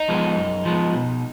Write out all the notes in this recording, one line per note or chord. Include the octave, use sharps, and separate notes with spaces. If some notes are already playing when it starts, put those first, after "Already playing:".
Already playing: D#4
F3 G#3 B3
F#2
F3 G#3 B3
B2